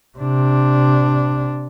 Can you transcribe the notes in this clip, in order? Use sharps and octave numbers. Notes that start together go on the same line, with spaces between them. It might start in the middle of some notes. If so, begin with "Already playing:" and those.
C3 D4